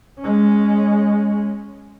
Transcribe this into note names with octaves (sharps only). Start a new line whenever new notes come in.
G#3 C#4